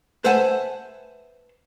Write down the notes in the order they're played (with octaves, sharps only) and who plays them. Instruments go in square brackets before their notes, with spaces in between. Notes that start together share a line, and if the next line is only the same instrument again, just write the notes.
[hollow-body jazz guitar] B4 C5 E5 F#5 G#5 A5